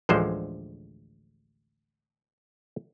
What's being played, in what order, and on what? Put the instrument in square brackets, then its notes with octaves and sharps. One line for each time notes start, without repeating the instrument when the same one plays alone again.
[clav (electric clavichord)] A1 D2 D3 F3 G#3 C5